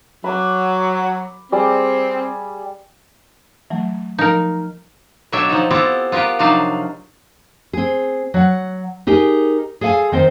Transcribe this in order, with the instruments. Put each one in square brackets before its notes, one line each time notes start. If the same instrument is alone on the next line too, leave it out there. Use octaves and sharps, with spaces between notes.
[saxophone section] F#3 [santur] B5 D6
[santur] G3 G#4 D5 [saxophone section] C4
[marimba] E3 F#3 A3
[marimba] F3 [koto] D#4 A#4
[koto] B2 F#3 D4 C#5 E5 G5
F3 D#4
B3 C4 E4 F4 G4 A4
B3 F4 G4 A#4 B4
C3 F3 F#3 D4 D#4 F5
[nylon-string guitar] C4 G#4
F#3 F#5
D#4 G4 G#4 A#4
G#4 A4 F5 F#5 G#5
D#3 C4 C5